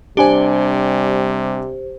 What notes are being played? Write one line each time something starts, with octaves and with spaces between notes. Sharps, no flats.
C3 G3 D4 G4 C5 D5 G#5